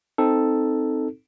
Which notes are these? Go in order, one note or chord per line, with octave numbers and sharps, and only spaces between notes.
C4 D#4 A4